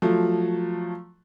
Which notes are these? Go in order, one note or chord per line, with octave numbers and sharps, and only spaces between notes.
F3 F#3 A3